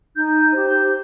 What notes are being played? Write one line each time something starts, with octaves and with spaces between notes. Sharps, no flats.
D#4 G6
G4 C5
G6